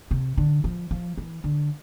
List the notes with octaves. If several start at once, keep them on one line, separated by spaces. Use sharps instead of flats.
C3
D3
F3
F3
E3
D3